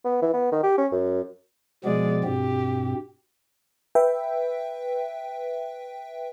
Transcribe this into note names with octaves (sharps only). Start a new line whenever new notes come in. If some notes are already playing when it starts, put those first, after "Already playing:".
B3
E3
B3
D#3
G4
C#4
F#2
B2 F3 G#3 B3 D5
G2 B2 C4 G4
B4 E5 G5